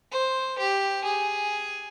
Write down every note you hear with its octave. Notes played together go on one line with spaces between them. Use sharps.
C5
G4
G#4